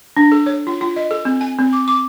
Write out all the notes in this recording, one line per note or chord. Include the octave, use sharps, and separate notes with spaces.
D4
A4
C#5
F4
F4
D#5
A4
C4
G#5
C4
D6
D6